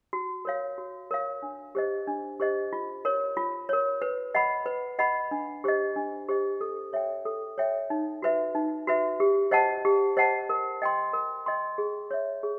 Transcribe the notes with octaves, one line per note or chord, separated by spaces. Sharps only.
F#4
A#4 C#5 F5
F#4
A#4 C#5 F5
D4
G4 C5 D#5
D4
G4 C5 D#5
F4
A#4 C#5
F4
A#4 C#5
B4
D#5 F#5 B5
B4
D#5 F#5 B5
D4
G4 C5 D#5
D4
G4 C5 D#5
A4
C#5 E5 G5
A4
C#5 E5 G5
D#4
F#4 B4 E5
D#4
F#4 B4 E5
G4
C5 D#5 F#5 A5
G4
C5 D#5 F#5 A5
A#4
D#5 G5 C6
A#4
D#5 G5 C6
G#4
C#5 E5
G#4